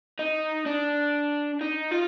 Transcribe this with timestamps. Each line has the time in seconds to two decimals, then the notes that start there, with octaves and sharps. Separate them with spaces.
0.19 D#4
0.66 D4
1.61 D#4
1.92 F4